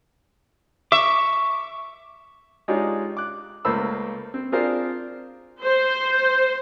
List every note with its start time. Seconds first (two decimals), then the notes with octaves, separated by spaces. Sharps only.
0.92 E5 C#6 D6
2.68 G#3 D4 D#4 F4 G4 C#5
3.17 D6 F#6
3.65 C#2 A3 A#3 C5 B5 E6
4.34 C4
4.52 C4 D4 F4 G#4 A#4 C5
5.63 C5